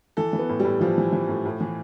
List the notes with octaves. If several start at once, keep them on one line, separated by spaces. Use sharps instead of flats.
E3 A4
E3
B3
A2
A2 G3
E3 F3
E3
E3
A2
A2
E3